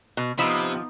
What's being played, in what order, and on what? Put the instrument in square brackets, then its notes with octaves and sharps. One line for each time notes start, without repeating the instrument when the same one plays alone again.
[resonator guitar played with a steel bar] B2
[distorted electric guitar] C3 [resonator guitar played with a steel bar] F3 [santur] B3 D#4 [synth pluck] B5 E6